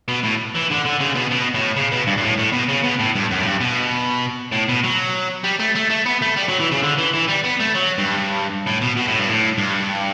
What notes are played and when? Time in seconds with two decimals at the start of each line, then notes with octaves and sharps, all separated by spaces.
0.08 B2
0.23 A2
0.55 E3
0.70 D3
0.85 D3
1.00 C#3
1.15 B2
1.31 B2
1.54 A2
1.76 C#3
1.92 B2
2.07 G2
2.17 G2
2.23 A2
2.38 A2
2.53 B2
2.69 C#3
2.84 B2
2.99 A2
3.15 G2
3.31 F#2
3.39 A2
3.45 G2
3.61 B2
4.52 A2
4.69 B2
4.83 F#3
5.44 G3
5.60 A3
5.76 A3
5.90 A3
6.06 B3
6.22 A3
6.36 G3
6.48 F#3
6.59 E3
6.71 C#3
6.83 D3
6.98 E3
7.14 E3
7.28 G3
7.44 B3
7.60 A3
7.75 F#3
7.98 G2
8.67 A2
8.82 B2
8.97 B2
9.07 A2
9.19 G2
9.29 A2
9.58 G2